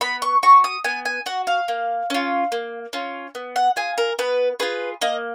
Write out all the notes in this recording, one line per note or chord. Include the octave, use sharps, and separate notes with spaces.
B3 B5
C#6
F#4 C#6
D#6
B3 G#5
G#5
F#4 F#5
F5
A#3
C#4 F4
A#3
C#4 F4
B3
F#5
F4 G#4 G#5
A#4
B3 B4
F4 G#4 B4
A#3 D#5